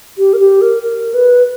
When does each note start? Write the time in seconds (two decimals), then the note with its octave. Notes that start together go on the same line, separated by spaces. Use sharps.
0.18 G4
0.33 A#4
0.39 G4
0.61 A#4
0.82 A#4
1.14 B4